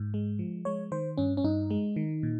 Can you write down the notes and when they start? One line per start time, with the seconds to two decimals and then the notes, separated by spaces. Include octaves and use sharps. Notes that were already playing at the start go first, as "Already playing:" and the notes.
Already playing: G#2
0.14 G#3
0.39 F3
0.65 G#3 C#5
0.92 D#3 C5
1.18 G2 C#4
1.37 C#4
1.44 G2 D#4
1.70 G#3
1.96 D#3
2.23 A#2